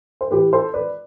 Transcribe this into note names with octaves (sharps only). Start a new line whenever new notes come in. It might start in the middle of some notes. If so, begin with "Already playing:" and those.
C5
A2 E3 G4 B4
A4 C5
B4 D5